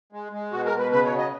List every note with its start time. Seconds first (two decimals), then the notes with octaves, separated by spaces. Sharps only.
0.13 G#3
0.32 G#3
0.52 B2 F#4
0.66 A#4
0.72 B2
0.78 B4
0.91 C#3 B4
1.05 C#5
1.11 F#3
1.18 D#5